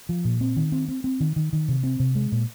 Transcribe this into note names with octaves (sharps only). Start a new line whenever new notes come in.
F3
A#2
C4
D#3
C4
C4
C4
D#3
D#3
D#3
C3
C4
C3
G#3
A#2